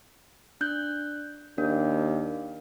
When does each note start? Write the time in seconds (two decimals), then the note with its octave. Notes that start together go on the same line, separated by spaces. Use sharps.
0.61 D4 F#6 G6
1.58 D#2 D4